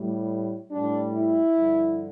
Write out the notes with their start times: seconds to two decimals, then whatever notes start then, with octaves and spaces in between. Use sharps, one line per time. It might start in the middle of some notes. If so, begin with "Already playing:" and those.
Already playing: A2 G3
0.71 A2 G3 D4
1.14 E4
1.56 G2 D3 F3